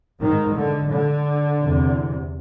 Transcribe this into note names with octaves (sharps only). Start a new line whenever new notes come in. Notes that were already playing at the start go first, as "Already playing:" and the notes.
G#2 D#3
D3
D3
E2 C3